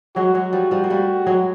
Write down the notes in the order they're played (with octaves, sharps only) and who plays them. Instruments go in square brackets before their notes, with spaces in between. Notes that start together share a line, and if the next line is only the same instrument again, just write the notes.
[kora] F#3 G#3 [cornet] F#4
[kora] F#3 G#3
F3 G3
F3 G3
A#3
G3 A3
F#3 G#3